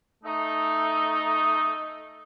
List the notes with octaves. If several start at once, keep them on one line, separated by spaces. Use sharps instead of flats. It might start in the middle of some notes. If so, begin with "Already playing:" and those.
A3 D#4